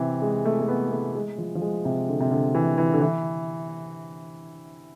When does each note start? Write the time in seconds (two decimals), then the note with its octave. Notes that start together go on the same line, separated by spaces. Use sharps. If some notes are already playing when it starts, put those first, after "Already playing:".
Already playing: C3 E3
0.22 G#3
0.45 A3
0.61 A3
0.68 B3
0.92 A3
1.15 G#3
1.38 F3
1.55 F3
1.62 G#3
1.85 C3
2.09 D3
2.20 C3
2.31 D3
2.55 E3
2.78 E3
2.93 D3
3.02 E3